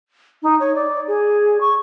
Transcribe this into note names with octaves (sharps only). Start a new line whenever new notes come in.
D#4
C#5
D5
G#4
C#6